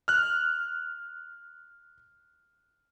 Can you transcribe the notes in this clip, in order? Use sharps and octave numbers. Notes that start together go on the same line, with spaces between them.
F6 F#6